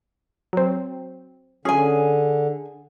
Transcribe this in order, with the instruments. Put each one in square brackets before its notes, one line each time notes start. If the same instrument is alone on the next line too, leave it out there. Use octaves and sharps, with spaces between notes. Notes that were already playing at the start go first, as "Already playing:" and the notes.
[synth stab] F#3 C4
[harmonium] D3 [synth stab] C#4 [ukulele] G#4 G#5